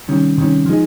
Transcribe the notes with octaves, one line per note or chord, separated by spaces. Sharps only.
C3 D#3 G3 C#4
C3 D#3 G3 C#4
F3 G#3 D#4 G#4